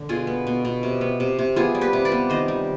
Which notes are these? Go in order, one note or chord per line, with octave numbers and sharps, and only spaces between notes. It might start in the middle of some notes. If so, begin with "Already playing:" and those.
Already playing: D3
B2 F4 G#4
B3
B2
B2
C3
B3
C3
C3
B3 F4 G#4
G3
G4 B4
C3
B4 D5
B3
D#3 C5 D#5
G3